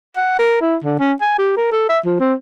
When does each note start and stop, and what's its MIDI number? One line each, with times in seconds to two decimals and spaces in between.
0.16 0.37 78
0.39 0.56 70
0.61 0.76 64
0.84 0.97 50
0.99 1.13 61
1.21 1.38 80
1.38 1.56 67
1.57 1.69 70
1.72 1.87 69
1.89 1.99 76
2.05 2.18 53
2.20 2.34 60